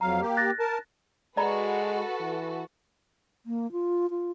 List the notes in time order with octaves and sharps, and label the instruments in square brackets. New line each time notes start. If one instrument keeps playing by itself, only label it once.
[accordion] F2 F#3 F5 [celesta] A#5
[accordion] A#3 G4
[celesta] F#6 A6 A#6
[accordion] A#4 A5
[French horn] G#3 [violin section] F#4 A4 B4 [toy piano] D5 A#5 B5
[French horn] E3
[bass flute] A#3
F4
F4